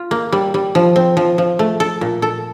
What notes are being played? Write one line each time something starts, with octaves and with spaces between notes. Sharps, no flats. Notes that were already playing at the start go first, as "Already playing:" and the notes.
Already playing: F4
A#3
G3
G3
F3
C4
F3
F3
A3
A4
A#2
A4